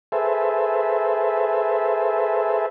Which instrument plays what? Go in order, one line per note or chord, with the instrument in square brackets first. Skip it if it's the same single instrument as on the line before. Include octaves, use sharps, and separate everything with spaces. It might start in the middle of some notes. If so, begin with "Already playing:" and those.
[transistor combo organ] G#4 A4 B4 C5 E5